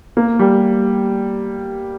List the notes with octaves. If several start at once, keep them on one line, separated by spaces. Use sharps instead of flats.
A#3
G3